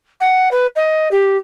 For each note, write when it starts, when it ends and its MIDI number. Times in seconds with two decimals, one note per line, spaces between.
0.20 0.49 78
0.51 0.66 71
0.76 1.08 75
1.11 1.37 67